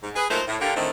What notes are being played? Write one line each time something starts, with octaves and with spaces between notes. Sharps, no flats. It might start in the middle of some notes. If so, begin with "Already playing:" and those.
G#2
G#4 B4
A#2 F#3 A3 D#4 A#4 C5
A2
D3 A#3 G4
A2 D3 D#3 A3 C4